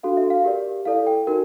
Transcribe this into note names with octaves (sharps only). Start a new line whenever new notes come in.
D4 F#4 A4 F5
E5
F5
G4 A#4 D5
E4 A4 D5 F5
G5
D#4 F#4 A#4